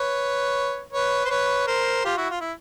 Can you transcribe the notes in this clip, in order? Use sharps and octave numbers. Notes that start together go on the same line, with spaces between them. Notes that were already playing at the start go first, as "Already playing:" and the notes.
Already playing: B4 C#5
B4 C#5
C5
B4 C#5
A#4 C5
F4 G4
E4 F#4
F4
E4